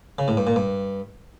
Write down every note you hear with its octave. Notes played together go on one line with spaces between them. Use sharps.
C#3
A2
G2
A#2
G2